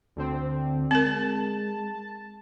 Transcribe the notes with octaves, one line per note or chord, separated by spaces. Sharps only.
D2 D3 C4
G#3 C4 A#4 A5